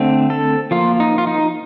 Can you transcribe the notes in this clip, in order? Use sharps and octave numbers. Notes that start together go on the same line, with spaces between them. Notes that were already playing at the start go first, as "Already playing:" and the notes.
Already playing: D3 A3 C4
A4
F3 A#3 F4
D#4
F4
D#4